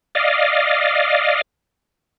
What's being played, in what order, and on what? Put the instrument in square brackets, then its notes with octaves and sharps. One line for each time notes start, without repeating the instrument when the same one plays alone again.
[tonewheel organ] D5 D#5 F5